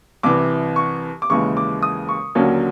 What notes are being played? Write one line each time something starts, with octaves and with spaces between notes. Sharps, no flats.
C2 C3 E3 D6
C#6
D6
D#2 C#3 E3 G#3 C#6
D6
D#6
C#6
D#2 D3 F#3 A#3 C#4